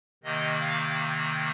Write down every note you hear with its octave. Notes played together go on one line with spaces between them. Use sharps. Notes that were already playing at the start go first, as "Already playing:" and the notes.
C3 D#3 A#3 D#5
F5